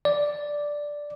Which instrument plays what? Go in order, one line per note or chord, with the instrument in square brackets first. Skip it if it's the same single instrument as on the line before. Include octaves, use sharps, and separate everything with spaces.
[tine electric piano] D5